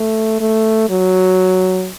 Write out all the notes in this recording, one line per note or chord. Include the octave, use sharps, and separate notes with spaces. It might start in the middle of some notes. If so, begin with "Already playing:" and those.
Already playing: A3
A3
F#3